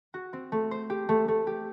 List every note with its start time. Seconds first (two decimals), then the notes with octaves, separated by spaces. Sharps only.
0.14 F#4
0.33 C4
0.52 A3
0.71 C5
0.90 G4
1.09 A3
1.28 A3
1.47 G4